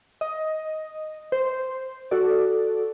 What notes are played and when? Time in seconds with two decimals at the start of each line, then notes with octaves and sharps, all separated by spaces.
0.21 D#5
1.32 C5
2.11 F#4 A4 D5